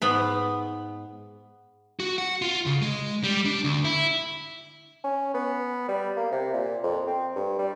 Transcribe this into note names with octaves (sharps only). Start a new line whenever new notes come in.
G#2 B3 B5
F#4
F#5
F4
C#3
G#3
G3
D4
D2
E4
C#4
B3
G3
A#3
C3
A#2
F2
C4
G2
G3